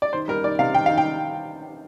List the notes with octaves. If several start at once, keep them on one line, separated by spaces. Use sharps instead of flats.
D5
D#3 C5
G3 A#4
D#3 D5
C3 F5
D#3 G5
D#3 F5
G5